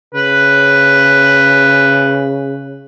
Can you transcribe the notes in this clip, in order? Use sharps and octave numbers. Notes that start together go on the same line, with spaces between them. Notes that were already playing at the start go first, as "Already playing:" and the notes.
C#3 B4